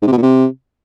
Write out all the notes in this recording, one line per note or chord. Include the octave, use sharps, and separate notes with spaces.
G#2
C3
B2
A#2
C3